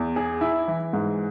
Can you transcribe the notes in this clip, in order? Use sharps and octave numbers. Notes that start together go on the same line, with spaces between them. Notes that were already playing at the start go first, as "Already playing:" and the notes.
Already playing: E2
G#4
E4
E3
G#2